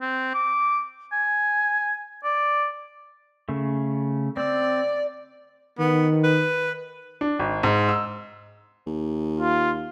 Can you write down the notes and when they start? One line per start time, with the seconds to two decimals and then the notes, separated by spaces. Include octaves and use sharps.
0.01 C4
0.34 D6
1.13 G#5
2.24 D5
3.49 C#3 A3
4.37 C4 D5 E6
5.79 D#3 B3
6.24 B4
7.21 D4
7.39 G#1
7.63 G#2
7.89 E6
8.87 D#2
9.40 F4